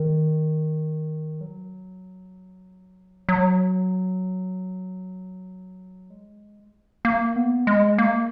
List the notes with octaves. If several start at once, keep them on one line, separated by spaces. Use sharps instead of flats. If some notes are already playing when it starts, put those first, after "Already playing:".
Already playing: D#3
F#3
F#3
G#3
A#3
B3
G#3
A#3